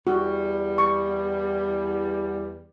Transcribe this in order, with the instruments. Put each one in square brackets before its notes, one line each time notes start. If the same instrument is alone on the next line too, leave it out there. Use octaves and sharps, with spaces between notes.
[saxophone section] E2 G3 [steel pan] F#4
[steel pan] C#6